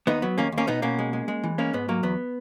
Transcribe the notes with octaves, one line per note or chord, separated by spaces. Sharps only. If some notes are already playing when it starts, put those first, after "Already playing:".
D#2 B3 D#4
F#3 B3
D#2 A#3 C#4
D#2
A#3 C#4
B2 B3 D#4
B2 A#3 C#4
G#3
G#3
G#3
E3
G#3 A#3 C#4
G#2 B3
F#3 A#3
E2 B3